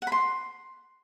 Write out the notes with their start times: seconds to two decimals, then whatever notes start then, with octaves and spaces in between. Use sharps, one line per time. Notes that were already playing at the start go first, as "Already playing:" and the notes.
0.02 F#5
0.07 B5
0.12 C6